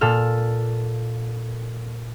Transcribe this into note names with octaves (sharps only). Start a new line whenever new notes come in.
A#2 A4 F6